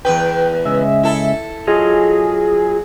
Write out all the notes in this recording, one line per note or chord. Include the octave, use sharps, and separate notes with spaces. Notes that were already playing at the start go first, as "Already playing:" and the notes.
E2 G#2 B4 G5
C#3 G#3 E5
E4 A4
F#3 F4 G#4 D#5